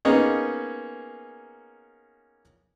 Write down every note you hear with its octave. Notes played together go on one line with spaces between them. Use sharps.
A#3 B3 C#4 D#4 G#4